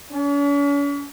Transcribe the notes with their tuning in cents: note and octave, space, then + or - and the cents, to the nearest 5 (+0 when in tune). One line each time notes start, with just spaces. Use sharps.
C#4 +45